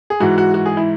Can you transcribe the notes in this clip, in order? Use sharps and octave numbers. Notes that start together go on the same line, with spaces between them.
G#4
G#2 E3 F#4
F#4
F#4
G#4
E4